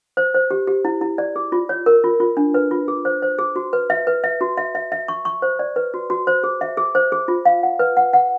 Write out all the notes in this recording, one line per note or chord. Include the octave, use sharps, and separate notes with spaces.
C5
C5
G4
G4
E4
E4
D5
G#4
F4
C#5
A#4
F4
F4
D4
B4
F4
G#4
C5
C5
G#4
F#4
B4
E5
B4
E5
F#4
E5
E5
E5
C#6
C#6
C5
D5
B4
F#4
F#4
C5
G#4
E5
G#4
C5
G#4
F4
F5
F#5
B4
F#5
F#5